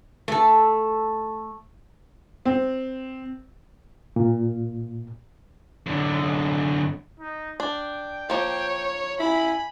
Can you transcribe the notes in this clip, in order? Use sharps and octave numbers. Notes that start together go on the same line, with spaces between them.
A3 A4
C4
A#2
F#2 D3
D#4
D4 G5
F3 A#3 C#5
E4 G#5 B5